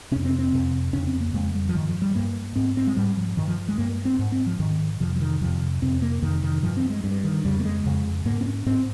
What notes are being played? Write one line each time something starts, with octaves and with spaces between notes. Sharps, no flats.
F2 C3 C#4
C4
C4
F2 C3
F2 C#3 C#4
C4
A#3
F2 C#3 G#3
G3
F3
G2 D#3
F3
G3
G2 A#3
G#2 C4
C4
G#3
G#2 G3
F3
G2 D#3
F3
G#3
G2 A#3
C4
G#2
C4
F3
G#2 D#3
F2 C3 F3
F3
D#3
F2 C3 F3
F2 C3 C4
A#3
F2 C3 D#3
D#3
G2 F3
C4
G#3
G2
D#3
F2 C#3 G3
A#3
G#3
F2 C#3
G#2 A#3
C4
C#4
G#2 C4